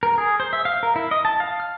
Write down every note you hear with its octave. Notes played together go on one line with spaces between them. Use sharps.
A#4
G#4
C5
E5
F5
A#4
E4
D#5
A5
F5
F6